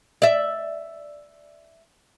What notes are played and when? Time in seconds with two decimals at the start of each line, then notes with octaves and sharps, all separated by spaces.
0.22 D5 E5